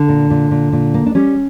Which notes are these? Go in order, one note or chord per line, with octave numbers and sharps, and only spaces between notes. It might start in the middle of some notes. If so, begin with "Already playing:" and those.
Already playing: D3 D4
A#2
A#2
A#2
A#2
A#3
D4
G3 C#4